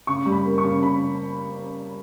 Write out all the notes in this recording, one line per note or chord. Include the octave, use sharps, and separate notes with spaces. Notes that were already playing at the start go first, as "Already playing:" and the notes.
C#3 C#6
G3
B5
A#3
C#6
C#3
C#3 B5